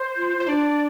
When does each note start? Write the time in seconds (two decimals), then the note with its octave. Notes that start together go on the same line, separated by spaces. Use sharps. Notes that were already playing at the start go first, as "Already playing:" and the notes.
Already playing: C5
0.17 F4
0.37 F4 C5
0.48 D4 D5